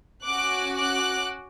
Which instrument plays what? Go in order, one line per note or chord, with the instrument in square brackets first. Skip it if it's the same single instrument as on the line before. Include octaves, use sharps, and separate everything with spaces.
[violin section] C#4 F#4 D6 F#6
D6 F#6